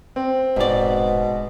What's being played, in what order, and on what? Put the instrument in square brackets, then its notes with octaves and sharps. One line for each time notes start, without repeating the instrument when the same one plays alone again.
[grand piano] C4
[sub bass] D#1 [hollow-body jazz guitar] G#2 D5 [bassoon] B2